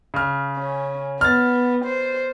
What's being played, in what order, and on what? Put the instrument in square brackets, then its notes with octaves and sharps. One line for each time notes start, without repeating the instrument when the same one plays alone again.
[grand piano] C#3 F6
[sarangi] C#4
[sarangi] B3 [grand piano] F6 A6
[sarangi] C5